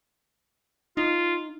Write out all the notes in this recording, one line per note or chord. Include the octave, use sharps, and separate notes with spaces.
D#4 F4